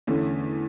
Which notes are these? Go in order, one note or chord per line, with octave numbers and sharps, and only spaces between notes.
E2 D3 A3 C#4